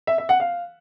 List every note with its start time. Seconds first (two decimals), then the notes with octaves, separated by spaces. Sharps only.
0.07 E5
0.18 E5
0.29 F#5
0.40 F5